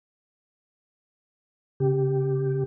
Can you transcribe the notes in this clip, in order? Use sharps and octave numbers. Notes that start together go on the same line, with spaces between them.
C#3 G4